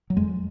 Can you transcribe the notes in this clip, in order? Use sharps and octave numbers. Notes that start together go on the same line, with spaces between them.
F#3
F2 G#3